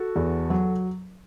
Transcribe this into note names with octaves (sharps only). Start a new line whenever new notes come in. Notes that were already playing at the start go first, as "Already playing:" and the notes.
Already playing: F#4 A4
E2
F#3